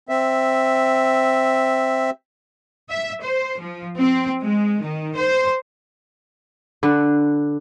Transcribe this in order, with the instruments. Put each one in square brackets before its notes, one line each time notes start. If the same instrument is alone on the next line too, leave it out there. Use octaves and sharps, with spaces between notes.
[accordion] C4 E5
[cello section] E5
C5
F3
C4
G#3
D#3
C5
[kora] D3 B4